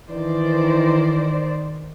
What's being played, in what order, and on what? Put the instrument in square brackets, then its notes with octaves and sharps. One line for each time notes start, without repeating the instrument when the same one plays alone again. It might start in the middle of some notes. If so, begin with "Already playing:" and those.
[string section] D#3 C5 D5 [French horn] E3